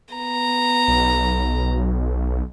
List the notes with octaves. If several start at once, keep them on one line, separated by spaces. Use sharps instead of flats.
B3 A#5
B1